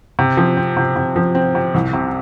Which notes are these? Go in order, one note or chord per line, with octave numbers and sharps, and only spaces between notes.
C3
F3
C4
C3
C3
F3
C4
C3
C2
C3